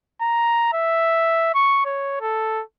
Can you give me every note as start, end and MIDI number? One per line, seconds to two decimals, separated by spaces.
0.22 0.73 82
0.73 1.54 76
1.55 1.81 85
1.85 2.19 73
2.21 2.63 69